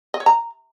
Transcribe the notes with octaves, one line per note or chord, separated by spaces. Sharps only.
D#5
C#5
A#5